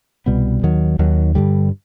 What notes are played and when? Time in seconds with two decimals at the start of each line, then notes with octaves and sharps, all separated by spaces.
0.26 C2 B2 G3 B3
0.63 D#2 D#3 F#3
0.99 D#2 D#3 F#3
1.35 G2 D3 G3